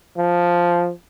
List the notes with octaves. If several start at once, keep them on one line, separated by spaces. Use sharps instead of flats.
F3